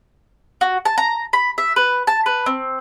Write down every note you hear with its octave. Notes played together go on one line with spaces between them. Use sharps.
F#4
A5
A#5
B5
E5
B4
A5
B4
C4